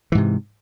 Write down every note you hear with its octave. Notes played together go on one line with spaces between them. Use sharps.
G#2 C3 E3